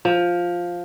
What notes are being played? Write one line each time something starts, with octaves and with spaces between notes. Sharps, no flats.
F3